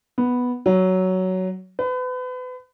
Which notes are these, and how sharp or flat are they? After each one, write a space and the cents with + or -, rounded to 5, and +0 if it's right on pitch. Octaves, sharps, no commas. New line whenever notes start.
B3 +0
F#3 +10
B4 +35